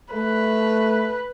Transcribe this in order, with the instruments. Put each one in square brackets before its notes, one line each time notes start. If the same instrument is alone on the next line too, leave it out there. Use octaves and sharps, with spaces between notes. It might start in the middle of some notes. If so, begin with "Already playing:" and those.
[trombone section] A3 [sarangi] B4